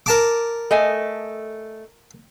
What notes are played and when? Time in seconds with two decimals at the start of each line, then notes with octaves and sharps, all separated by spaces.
0.06 A#4 A5 D6
0.71 A3 D#5 G#5